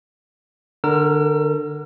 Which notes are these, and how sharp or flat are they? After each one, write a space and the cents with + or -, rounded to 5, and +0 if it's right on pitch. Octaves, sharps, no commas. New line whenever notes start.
D3 +20 A#4 +0 E6 +40